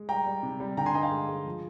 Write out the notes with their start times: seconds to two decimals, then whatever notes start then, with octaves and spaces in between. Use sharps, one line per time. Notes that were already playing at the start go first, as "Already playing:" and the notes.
Already playing: G#3
0.09 G3 G5 A#5
0.26 G3
0.43 C3
0.60 G3
0.77 D3 G5 A#5
0.86 G#5 C6
0.94 G2 D#5 G5
1.02 F5 G#5
1.11 G#3
1.28 G#3
1.45 F3